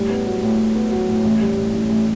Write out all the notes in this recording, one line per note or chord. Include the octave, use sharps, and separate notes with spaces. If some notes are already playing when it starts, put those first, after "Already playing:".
Already playing: A2 G3
B3
F#3
A2
A2
B3
F#3
A2
A1
G3
A2
A1
A1